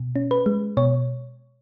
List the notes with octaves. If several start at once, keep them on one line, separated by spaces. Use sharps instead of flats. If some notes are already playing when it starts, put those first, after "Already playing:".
Already playing: B2
C#4
B4
G#3
B2 C#5